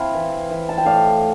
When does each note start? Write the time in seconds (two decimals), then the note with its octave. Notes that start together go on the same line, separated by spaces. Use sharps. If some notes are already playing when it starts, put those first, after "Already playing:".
Already playing: C4 E4 F5 A5
0.14 E3
0.50 E3
0.69 A5
0.78 G5
0.85 A2 D5 F5